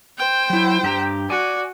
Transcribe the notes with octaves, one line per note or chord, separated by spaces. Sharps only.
C5 G5
F#3 E4
G2 G4 A#5
F#4 D5 G#5